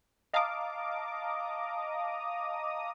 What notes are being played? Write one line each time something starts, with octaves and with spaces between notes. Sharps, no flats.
D#5 F5 A5 A#5 D6 D#6